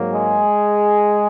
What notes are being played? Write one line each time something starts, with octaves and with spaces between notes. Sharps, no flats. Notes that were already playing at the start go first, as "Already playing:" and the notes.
Already playing: G#2 F#3 A#3
G#3 G#4